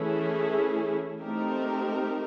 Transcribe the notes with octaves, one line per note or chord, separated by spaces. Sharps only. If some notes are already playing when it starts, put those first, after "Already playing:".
Already playing: E3 A3 C#4 E4 G#4
A3 C4 D#4 G4 A#4